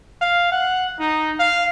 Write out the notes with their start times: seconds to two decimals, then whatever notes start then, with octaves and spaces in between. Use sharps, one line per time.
0.21 F5
0.52 F#5
0.99 D#4
1.39 F5